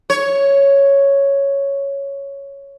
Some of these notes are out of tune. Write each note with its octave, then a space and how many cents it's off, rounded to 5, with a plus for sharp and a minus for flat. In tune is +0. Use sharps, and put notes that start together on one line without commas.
C#5 +0